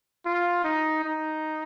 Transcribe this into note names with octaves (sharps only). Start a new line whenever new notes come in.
F4
D#4
D#4